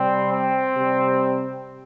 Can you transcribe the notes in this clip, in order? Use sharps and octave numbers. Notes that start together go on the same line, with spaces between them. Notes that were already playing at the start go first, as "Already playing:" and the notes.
Already playing: C3 G3 C4
C4
C3 G3